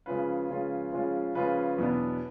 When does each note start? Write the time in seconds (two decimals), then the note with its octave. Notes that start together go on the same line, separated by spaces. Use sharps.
0.06 C#3 F3 G#3 C#4 F4 B4
0.50 C#3 F3 G#3 C#4 F4
0.92 C#3 F3 G#3 C#4 F4
1.35 C#3 F3 G#3 C#4 F4 B4
1.78 E2 B2 F#3 B3 D4